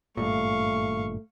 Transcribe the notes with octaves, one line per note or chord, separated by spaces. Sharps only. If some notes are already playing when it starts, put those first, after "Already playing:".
G#1 G2 A#2 A3 F5 C#6